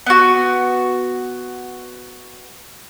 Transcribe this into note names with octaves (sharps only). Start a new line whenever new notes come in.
B3 F#4